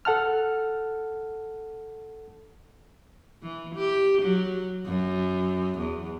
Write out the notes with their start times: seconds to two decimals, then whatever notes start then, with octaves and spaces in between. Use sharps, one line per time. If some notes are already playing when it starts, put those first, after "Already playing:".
0.05 A4 F#5 A5 F6
3.42 E3
3.75 G4
4.22 F#3
4.87 F#2
5.79 E2